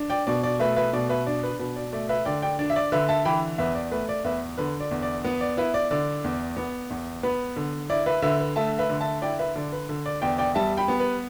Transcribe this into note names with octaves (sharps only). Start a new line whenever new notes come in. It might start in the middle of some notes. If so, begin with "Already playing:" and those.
Already playing: D4
D5 G5
B2 D5
D5
A3 B4 E5
B4 E5
B2 D5
B4 E5
D4 D5
B4
B2 B4
D5
A3 D5
B4 E5
D3 D5 G5
D5 G5
D4 D5
E5
D5
D3 B4 E5
E5 A5
E3 G5 B5
E2 B4 E5
D5
A3 B4
D5
E2 B4 E5
D3 B4
D5
E2
D5
B3 B4
D5
E4 B4 E5
D5
D3 D5
E2
B3
E2
B3 B4
D3
E4 D5
B4 E5
D3 B4 E5
B4
A3 E5 A5
B4 E5
D3
E5 A5
E4 D5 G5
B4 E5
D3 D5
B4
D3
D5
E2 D5 G5
D5 G5
G3 E5 A5
G5 B5
B3
B4